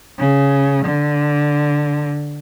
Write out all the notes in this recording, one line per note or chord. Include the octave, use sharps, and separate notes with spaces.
C#3
D3